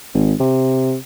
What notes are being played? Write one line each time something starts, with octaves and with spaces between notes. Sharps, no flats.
G#1
C3